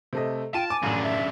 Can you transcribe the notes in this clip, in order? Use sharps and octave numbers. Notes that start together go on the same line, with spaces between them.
C3 A3 D#5
F4 G5 A5 D#7
G#5 D6
A1 F#2 C#3 D4
E5